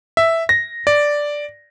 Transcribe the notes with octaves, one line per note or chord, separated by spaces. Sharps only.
E5
A#6
D5